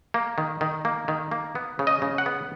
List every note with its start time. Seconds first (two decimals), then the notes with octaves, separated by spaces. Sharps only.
0.14 A#3
0.38 D#3
0.61 D#3
0.85 A#3
1.08 D#3
1.31 A#3
1.55 B3
1.79 C#3
1.87 D#5
2.02 C#3
2.18 F#5
2.26 B3